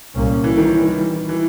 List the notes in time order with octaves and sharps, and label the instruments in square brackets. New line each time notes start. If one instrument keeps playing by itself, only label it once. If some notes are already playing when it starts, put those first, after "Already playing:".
[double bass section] C2 A#2 G3 A#3 C#4
[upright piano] E3
D#3
[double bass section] C3 E3 G3
[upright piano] E3